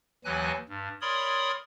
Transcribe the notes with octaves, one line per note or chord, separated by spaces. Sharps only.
D#2 E3 F#3 G#5 F#6
G2
A#4 C#5 D5 B5 C6 D#6